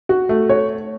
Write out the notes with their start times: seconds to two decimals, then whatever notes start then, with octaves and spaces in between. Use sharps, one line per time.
0.09 F#4
0.29 A3
0.49 C#5